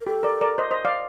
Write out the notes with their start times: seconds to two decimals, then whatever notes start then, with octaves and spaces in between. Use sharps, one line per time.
0.01 A#4
0.06 G4 A4
0.23 A#4 D5
0.41 A#4 D5
0.58 C5 D#5
0.71 C5 D#5
0.85 D5 F5